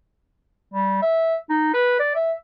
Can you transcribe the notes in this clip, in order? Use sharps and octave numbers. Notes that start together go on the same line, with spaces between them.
G3
E5
D#4
B4
D5
E5